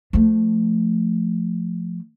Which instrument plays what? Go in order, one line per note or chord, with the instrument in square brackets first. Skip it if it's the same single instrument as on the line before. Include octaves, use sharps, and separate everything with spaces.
[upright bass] F3 A3